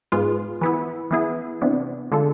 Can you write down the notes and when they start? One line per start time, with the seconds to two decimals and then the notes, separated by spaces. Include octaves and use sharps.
0.12 G#2 G#3 B3 F4
0.61 E3 B3 E4
1.11 E3 B3 E4 G#4
1.62 C3 E3 B3 D4
2.12 D3 G#3 D4 F4 A4